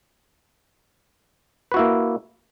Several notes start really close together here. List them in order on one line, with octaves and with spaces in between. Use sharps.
B4 F#4 E4 A#3